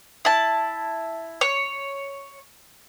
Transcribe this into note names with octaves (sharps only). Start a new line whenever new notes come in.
E4 A5
C#5